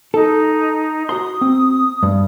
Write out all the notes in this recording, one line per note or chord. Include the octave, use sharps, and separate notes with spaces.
D#4 A4
F#4 A#5 C6 D#6
C4
G2